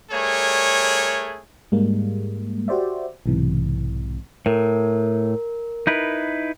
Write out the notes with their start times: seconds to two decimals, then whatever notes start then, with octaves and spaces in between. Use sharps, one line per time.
0.11 G3 A3 G#4 A#4 C#5
1.72 G#2 G3 G#3 A#3
2.68 F#4 G4 C5 D5 E5
3.26 B1 G#2 C3 E3
4.46 A2 A#4
5.87 D#4 E4 B4